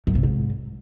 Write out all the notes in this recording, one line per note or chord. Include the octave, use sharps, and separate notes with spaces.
F#2
C3
G#2